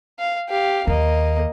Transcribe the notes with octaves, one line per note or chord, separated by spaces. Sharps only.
F5
G4 F5
D#2 A#3 D#5